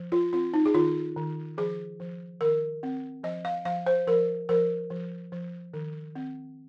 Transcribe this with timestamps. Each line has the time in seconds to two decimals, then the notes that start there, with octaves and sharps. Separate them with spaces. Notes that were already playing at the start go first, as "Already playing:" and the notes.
Already playing: F3
0.12 F4
0.33 C4 F4
0.54 D#4
0.66 G#4
0.74 D#3 F4
1.16 D#3
1.58 F3 G#4
2.00 F3
2.41 D#3 A#4
2.83 C4
3.23 F3 D#5
3.45 F5
3.65 F3 F5
3.87 C5
4.07 F3 A#4
4.49 F3 A#4
4.90 F3
5.32 F3
5.74 D#3
6.15 C4